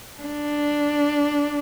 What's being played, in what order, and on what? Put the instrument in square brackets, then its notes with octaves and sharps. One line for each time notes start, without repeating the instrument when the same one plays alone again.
[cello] D4